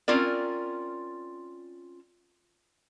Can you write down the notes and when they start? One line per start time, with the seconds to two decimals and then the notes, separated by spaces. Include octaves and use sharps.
0.08 C4 C#4 F4 A#4 D5